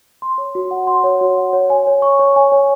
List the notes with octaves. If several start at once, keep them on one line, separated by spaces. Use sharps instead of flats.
C6
C#5
F#4
F#5
C6
C#5
F#4
F#5
C#5
G#5
C#5
C#6
C#5
G#5
C#5